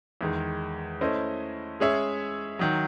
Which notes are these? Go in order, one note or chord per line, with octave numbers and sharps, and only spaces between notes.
E2 D#3 G#3
A3 C#4 E4 C5 D#5
G#3 C#4 G#4 C#5 E5
D#3 F#3